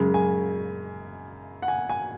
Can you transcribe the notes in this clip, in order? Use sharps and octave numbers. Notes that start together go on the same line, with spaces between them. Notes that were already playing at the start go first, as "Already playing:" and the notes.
Already playing: F#2 C#3 G#3
G#5
F#5
G#5
G#5